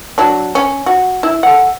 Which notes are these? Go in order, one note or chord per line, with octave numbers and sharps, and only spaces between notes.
F#3 D4
C#4
F#4
E4
A4 F#5